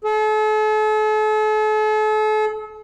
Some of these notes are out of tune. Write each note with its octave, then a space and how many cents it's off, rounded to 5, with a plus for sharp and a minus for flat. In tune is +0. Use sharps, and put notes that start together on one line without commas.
A4 -40